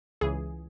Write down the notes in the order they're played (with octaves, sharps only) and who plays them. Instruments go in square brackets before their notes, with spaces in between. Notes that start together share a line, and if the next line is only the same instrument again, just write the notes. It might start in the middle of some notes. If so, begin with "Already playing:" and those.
[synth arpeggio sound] C#2 C#3 E3 G#4